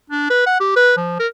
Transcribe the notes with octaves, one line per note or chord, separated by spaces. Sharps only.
D4
B4
F#5
G4
B4
F3
A#4